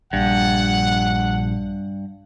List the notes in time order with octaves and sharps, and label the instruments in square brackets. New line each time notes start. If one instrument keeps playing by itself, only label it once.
[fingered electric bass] A#1 [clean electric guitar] G2 [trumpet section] F#5